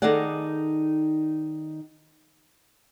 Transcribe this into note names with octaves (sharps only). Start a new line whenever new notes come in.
D#3 D#4 G#4 A4 D5 F#5